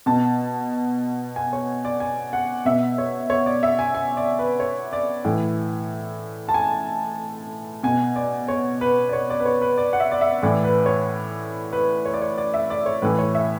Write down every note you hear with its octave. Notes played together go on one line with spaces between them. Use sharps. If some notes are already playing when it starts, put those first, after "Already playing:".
B2 A5
G#5
C#5
D5
G#5
F#5
B2 E5
C#5
C#5
D5
E5
G#5
G#5
D5
B4
C#5
D5
A2 E3
A5
G#5
B2 G#5
D5
C#5
B4
D5
C#5
D5
B4
C#5
B4
D5
F#5
E5
D5
E5
A2 E3 D5
B4
C#5
B4
C#5
D5
C#5
D5
E5
D5
C#5
A2 E3 B4
C#5
E5